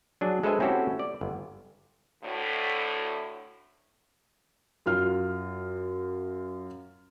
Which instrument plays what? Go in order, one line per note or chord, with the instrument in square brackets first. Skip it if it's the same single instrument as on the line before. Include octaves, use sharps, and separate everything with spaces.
[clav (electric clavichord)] F#3 D4 G#4
G#3 A4 B4 C5 E5 G#5
C4 C#4 E4 F#4 G4 A4
D5
G1
[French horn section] D2 A2
[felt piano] F#2 F4 F6